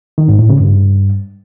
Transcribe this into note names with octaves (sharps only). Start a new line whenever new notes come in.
D#3
G#2
A2
C#3
G2